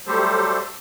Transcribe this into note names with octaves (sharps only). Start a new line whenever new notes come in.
F#3 G3 A3 G4 A4 C5